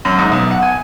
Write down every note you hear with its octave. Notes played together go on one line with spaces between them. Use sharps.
F#2
G#2
B1
F#5
G#5